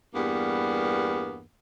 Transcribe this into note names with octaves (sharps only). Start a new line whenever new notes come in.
E2 G2 G3 A#3 B3